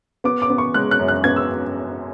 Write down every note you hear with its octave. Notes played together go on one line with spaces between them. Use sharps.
B3 D6
D6
B3
C#6
G#3 F#6
F#6
F#2
F#6
B3 G#6
E6